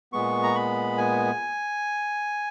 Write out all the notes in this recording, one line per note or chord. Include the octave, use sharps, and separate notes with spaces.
A#2 G#3 B3 C#6
A#5
B5
G#5